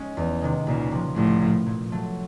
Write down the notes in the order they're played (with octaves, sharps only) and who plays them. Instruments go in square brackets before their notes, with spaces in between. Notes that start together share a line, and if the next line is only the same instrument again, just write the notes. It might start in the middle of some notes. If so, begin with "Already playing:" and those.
Already playing: [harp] G#3 C#4
E2
C3 D#3 G#3
[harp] C#2 [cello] A#2
[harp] C3 F3
[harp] C2 [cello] A2
[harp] A#2 F3
A#2
F#3 A3